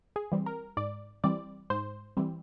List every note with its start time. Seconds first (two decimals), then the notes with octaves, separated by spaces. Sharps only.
0.16 G#4
0.32 E3 G3 C4
0.46 A#4
0.77 G#2 D5
1.24 E3 G3 C4 D5
1.70 G#2 C5
2.17 E3 G3 C4